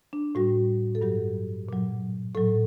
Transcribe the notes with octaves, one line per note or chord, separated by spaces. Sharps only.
D4
A2 G3 F#4
A4
G2 F#3 G4
A#2 F#3
A2 F#3 A4